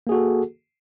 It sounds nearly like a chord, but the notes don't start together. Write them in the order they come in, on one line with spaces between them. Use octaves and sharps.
A#3 G#4 F#4 A4